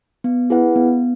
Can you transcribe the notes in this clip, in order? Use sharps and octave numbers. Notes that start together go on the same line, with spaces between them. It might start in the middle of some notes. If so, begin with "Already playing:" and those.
B3
E4 G#4 B4 F#5
B3